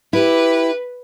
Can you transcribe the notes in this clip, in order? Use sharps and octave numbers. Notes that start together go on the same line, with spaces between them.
E4 G4 B4